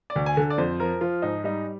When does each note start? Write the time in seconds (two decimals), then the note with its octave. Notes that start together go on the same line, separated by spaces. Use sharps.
0.10 D5
0.16 D2
0.26 G#5
0.37 D3
0.50 D5
0.58 F2 C5
0.80 F3 A#4
1.01 F3 F4
1.22 G#2 D#4
1.44 G3 D#4